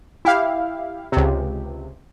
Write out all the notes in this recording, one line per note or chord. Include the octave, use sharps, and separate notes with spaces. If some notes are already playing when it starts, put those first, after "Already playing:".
E4 G4 F5
C#2 C3